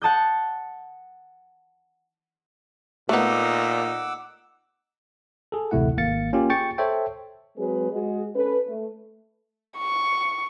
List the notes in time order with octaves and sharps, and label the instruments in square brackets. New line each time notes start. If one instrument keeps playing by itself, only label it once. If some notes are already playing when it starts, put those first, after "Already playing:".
[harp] F#5 A5 D#6 G6
[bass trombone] A#2 [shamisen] A3 B3 [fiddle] D#4 [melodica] F#5 D6 E6
[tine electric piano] G#4 A4
A1 D2 C3 A3 E4 F#5
G#1 A#3 F5 A6 C#7
A#3 C#4 F4 G4
G#4 G5 C#6 A6 C#7
A4 C5 C#5 E5 G5
[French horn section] F#3 G#3 C4 G#4 B4
G#3 F#4 G#4
C#4 A4 B4
A3
[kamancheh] C#6